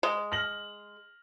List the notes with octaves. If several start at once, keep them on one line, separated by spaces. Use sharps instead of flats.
G#3
F6 A#6 F#7